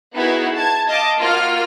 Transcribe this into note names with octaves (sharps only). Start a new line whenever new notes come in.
B3 D#4 E4 F#4 G#4
A5 G#6
D#5 F5 A5 D6
A#3 F4 F#4 F6